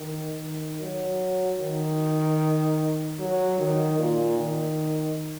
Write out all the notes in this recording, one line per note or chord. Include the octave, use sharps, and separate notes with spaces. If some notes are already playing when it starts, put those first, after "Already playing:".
Already playing: D#3
D#3
F#3
D#3
F#3
D#3
A#2
D#3